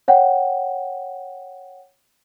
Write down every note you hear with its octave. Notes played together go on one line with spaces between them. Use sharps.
C#5 F#5 G5